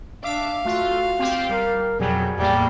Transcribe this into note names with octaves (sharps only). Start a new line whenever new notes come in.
D4 E5 F5 D6
A3 F4 F#4
C4 F4 G4
G3 A#4
F2 B2 F#3 G3 G#4
E2 A2 G3 A#3